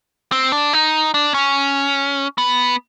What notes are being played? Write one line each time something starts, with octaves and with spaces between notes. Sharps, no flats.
C4
D4
D#4
D4
C#4
B3